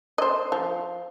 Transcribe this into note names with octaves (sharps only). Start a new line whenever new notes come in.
C5 D#5
F3